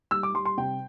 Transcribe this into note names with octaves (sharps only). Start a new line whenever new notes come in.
G3 E6
D6
G3 C6
C6
C3 G5